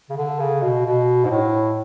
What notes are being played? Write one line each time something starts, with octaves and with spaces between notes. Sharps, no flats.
C#3
D3
C#3
B2
B2
G#2
A2